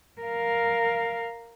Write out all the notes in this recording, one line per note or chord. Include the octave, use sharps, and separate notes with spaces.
A#4 F5